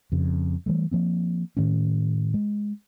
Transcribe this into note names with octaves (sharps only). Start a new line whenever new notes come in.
F2 C#3
E3 G3 A3
F3 A#3 C4
A2 D#3 A3 C#4
G#3